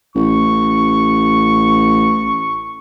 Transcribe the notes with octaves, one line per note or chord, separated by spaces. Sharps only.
A1 C#6